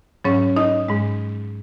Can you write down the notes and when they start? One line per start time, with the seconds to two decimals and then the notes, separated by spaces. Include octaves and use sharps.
0.25 G#2 F#3 C#4 C#5
0.56 D#4 D#5
0.88 G#2 G#3